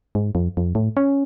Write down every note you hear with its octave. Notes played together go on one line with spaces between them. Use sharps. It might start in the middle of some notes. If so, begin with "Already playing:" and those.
G#2
F2
F2
A2
C#4